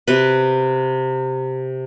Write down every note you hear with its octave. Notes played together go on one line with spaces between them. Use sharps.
C3 B4